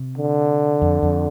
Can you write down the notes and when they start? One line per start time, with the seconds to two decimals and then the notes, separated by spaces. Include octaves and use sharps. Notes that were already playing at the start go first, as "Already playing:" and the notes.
Already playing: C3
0.17 D3
0.82 F2
1.03 F2